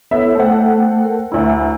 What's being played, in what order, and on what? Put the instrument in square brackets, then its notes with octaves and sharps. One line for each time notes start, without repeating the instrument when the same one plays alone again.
[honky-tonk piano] B3 E5 [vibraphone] E4 A4 C#5
[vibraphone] A3 G5 [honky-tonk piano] A4 C5 F#5
[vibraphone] A#4
[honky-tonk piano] D2 E4 [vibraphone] A#5 E6